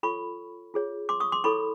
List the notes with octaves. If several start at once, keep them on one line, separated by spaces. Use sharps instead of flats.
F4 A4 C#5 B5 C#6
F4 G#4 C#5
C6 D6
C#6 D#6
C6 D6
E4 A4 C#5 B5 C#6